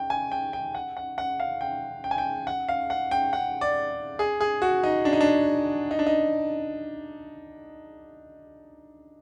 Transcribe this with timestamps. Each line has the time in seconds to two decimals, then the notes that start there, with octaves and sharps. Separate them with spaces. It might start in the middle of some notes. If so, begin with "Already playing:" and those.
Already playing: G5
0.10 G#5
0.32 G5
0.53 G5
0.75 F#5
0.97 F#5
1.18 F#5
1.40 F5
1.61 G5
2.04 G5
2.11 G#5
2.18 G5
2.47 F#5
2.69 F5
2.90 F#5
3.11 G5
3.33 F#5
3.61 D5
4.19 G#4
4.41 G#4
4.62 F#4
4.83 D#4
5.05 D4
5.13 D#4
5.21 D4
5.91 D#4
5.99 D4
6.07 D#4